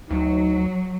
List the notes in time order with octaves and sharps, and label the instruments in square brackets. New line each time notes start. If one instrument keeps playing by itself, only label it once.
[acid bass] D2 [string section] F#3 [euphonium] D#4